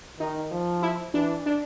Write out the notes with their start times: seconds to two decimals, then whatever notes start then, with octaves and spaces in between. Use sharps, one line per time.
0.20 D#3 D#4
0.52 F3
0.82 E4
1.14 E3 D4
1.46 D4